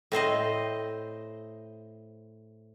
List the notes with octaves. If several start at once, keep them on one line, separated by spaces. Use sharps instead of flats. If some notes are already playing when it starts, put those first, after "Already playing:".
A2 C4 C5 D#5